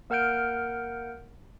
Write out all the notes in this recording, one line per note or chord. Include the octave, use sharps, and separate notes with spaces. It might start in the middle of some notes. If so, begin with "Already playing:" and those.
A#3 A#4 F#5 F6 G6 D7